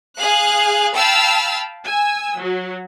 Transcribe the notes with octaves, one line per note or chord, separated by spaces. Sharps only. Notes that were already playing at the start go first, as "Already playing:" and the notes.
G#4 F5 F#6
F5 G5 A5 B5 E6 F6
G#5 E6
F#3